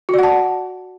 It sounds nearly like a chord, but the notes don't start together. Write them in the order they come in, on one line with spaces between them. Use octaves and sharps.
F#4 D5 F#5 A5